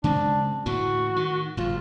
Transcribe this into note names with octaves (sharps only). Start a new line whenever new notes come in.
C#3 G#3 C4 D4
A2 D3 E3 F#4
D#3
F#1 G#2 F4